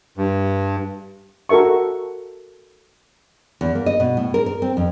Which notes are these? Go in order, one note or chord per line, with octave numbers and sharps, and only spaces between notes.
G2
F#4 A4 A#4 E5 C#6
E2
A#3
D#5
B2
A2
A#4
A#4
C4
F2